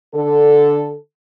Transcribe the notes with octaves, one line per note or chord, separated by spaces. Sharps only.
D3 A4